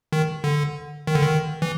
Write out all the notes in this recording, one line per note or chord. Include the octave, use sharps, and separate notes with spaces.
D#3
D3
D#3
D3
D#3
E3